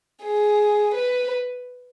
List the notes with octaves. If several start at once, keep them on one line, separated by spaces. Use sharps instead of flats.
G#4
B4